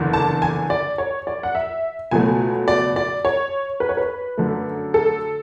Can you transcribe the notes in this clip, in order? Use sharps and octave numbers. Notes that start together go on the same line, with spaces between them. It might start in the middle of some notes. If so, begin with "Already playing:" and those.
Already playing: F#1 E2 D3
A5
G#5
D5
C#5
D5
F#5
E5
C#2 B2 F#3 A3 G#5
D5
D5
C#5
B4
C#5
B4
F#2 D3 A3
A4